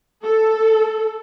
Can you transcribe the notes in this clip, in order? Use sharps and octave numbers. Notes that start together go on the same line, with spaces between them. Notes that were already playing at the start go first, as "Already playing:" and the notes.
A4